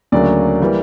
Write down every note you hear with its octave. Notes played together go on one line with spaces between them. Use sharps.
D2 C#3 F#3 A#3 D5
E3 G3 A#3